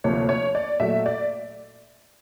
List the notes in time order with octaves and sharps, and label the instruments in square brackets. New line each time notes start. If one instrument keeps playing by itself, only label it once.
[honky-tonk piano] D2 C3 F3 A#3 C#5
C#5
D5
A#2 F#3 A3 E5
D5